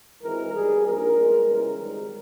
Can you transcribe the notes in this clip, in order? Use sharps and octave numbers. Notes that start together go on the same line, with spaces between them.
G#1 G#2 E3 G#3 A#4
B1 B2 G3 G#4
A#1 G#2 G3 A#4
B1 B2 G#3
C#2 C#3 E3 G3 A#4
G#1 G#2 D#3 G3